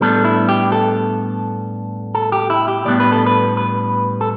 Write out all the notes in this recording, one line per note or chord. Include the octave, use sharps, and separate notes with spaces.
A2 G3 B3 D4 A4
E4
G4
A4
A4
G4
E4
G4
A2 G3 B3 D4 D5
B4
A4
B4
B4
A4